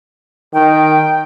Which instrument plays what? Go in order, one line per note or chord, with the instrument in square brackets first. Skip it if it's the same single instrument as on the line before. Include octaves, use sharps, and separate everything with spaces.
[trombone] D#3 [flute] G5